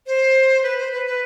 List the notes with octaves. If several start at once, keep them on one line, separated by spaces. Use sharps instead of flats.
C5
B4
C5
B4
B4